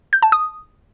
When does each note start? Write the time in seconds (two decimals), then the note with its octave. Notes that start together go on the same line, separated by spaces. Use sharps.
0.13 G6
0.23 A5
0.32 D#6